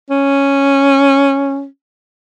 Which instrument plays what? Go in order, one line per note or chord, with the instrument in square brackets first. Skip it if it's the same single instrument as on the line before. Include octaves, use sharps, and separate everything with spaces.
[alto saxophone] C#4